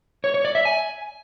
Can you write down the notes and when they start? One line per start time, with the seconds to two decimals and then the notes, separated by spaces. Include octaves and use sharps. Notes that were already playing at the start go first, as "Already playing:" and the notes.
0.24 C#5
0.34 C#5
0.45 D5
0.55 E5
0.65 G#5